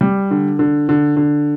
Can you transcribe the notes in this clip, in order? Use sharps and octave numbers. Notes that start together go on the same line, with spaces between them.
G3
D3
D3
D3
D3